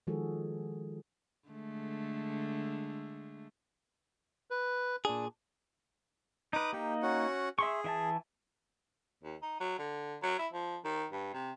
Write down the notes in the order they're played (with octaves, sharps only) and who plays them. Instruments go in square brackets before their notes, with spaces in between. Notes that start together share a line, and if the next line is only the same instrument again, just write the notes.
[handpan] D#3 F3 G#3 F#4 G#4 A4
[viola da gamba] D3 G#3 A3
[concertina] B4
[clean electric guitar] A#2 G#4 [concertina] D4
[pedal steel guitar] D#4 B4 [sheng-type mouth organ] D6 D#6
[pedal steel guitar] A#3 D#4 [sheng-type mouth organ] G4
[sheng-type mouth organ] C#4 F#4 F#5
[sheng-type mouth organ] G#4 [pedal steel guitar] E5 C6 C#6
[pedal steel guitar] E3 E5 A5
[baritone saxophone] D#2
D#4
F#3
D3
F#3
E4
F3
D#3
G2
C3